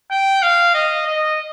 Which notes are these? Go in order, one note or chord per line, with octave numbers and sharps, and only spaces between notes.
G5
F5
D#5
D#5